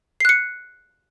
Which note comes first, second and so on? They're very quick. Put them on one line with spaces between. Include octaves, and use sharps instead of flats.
C7 F#6 C#7